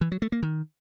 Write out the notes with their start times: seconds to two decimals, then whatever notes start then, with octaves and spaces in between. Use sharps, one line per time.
0.01 E3
0.12 F#3
0.22 A3
0.32 A#3
0.43 D#3